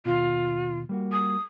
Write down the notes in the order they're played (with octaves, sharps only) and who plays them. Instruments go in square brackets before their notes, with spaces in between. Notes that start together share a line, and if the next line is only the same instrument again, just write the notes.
[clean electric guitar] D#2 B2 [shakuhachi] F4
[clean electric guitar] G3 A#3 F#4
[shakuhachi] D#6